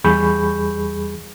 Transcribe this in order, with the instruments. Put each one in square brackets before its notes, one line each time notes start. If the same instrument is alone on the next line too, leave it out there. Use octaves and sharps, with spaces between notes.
[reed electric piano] E2 G3 G#4 B5 C#6 G6